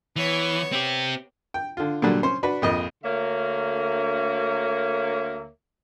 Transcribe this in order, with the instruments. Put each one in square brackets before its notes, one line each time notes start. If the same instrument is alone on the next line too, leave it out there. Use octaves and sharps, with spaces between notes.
[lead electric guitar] E3 [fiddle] B3 C#5
[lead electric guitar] C4 G4
[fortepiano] G5
D3 F4
A#2 D3 F#3 G3
C#4 C5
D4 F#4 B4
A#1 F2 D#5
[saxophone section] D2 D3 A#3 A#4 C#5 E5